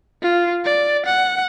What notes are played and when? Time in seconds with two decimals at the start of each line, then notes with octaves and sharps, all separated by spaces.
0.22 F4
0.65 D5
1.06 F#5